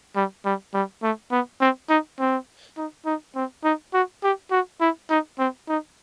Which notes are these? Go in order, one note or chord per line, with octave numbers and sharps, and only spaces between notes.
G3
G3
G3
A3
B3
C4
D#4
C4
D#4
D#4
C4
D#4
F#4
G4
F#4
E4
D#4
C4
D#4